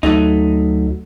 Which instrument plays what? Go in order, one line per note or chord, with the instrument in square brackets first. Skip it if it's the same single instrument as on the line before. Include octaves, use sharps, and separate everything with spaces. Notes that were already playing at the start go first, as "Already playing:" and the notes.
[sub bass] D2 [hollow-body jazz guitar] F#3 A3 D#4